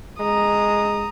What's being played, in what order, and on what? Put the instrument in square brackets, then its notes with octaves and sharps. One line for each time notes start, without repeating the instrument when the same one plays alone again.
[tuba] G#3 [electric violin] A#5 D#6